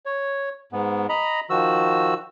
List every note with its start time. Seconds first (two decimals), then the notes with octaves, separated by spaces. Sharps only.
0.06 C#5
0.72 G#2 B3
1.09 D#5 A#5 B5
1.50 D#3 F3 F#4 E6